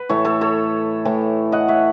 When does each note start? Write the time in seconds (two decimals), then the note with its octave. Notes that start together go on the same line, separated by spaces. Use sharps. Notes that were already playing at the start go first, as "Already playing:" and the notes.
Already playing: B4
0.09 A2 E3 A3 A4 C#5
0.25 A4 C#5
0.41 A4 C#5
1.05 A2 E3 A3
1.52 D#5 F#5
1.68 C#5 E5